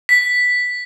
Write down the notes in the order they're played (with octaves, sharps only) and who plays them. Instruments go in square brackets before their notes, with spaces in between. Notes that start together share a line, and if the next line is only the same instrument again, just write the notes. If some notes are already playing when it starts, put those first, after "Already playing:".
[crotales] B6